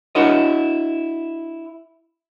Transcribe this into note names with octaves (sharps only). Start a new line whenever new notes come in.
D4 E4 F#4 A#4 C#5 D#5